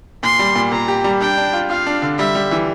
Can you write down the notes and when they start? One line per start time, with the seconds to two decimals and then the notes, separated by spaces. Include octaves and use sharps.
0.23 A#2 C6
0.39 G3
0.56 A#2
0.72 A#2 A#5
0.88 G4
1.04 G3
1.21 D4 G5
1.37 D4
1.53 F4
1.69 F4 F5
1.87 D4
2.02 D3
2.18 G3 E5
2.35 G3
2.51 E3